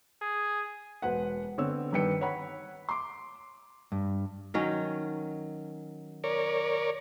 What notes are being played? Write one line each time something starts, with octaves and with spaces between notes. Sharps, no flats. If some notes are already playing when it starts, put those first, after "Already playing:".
G#4
E1 B4 C5 F#5
D3 B3 C4 C#5 E6
G2 D#3 B4 G5 C#7
C#5 F#5 B5 B6
C6 D6
G2
D#3 F#3 C#4
A#4 C#5 D5